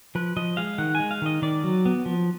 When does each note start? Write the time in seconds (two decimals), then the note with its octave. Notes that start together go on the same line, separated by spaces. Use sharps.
0.15 F3 B4
0.36 F3 D#5
0.57 G#3 F5
0.78 D#3 F#5
0.95 G#3 G#5
1.11 F5
1.22 D#3 D#5
1.42 D#3 D5
1.64 F#3
1.85 B3
2.06 F3